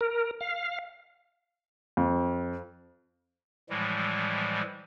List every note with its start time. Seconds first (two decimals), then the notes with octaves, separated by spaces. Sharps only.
0.01 A#4
0.41 F5
1.97 F2
3.70 A2 E3 F3 G3 G#3